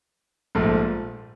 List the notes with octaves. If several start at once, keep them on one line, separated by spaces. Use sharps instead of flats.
A#1 G#2 F3 A3